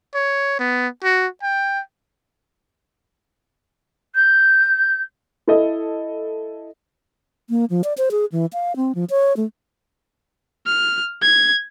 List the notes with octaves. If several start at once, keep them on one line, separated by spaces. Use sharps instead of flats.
C#5
B3
F#4
G5
G6
E4 A4 D#5
A#3
F3
D5
C5
G#4
E3
F5
C4
F3
C#5
A3
F6
G#6